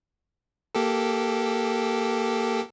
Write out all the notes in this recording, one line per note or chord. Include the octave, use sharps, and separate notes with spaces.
A#3 G4 A4